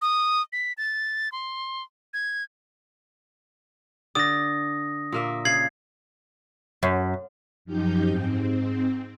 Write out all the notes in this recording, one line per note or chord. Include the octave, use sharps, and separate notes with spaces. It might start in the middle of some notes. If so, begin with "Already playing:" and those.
D#6
B6
A6
C6
G#6
D3 D5 D#6 A#6
A#2 A#3 E5
C#3 G#6 C7 F#7
F#2
F#2 F3 D#4 G4 G6
G#2 C4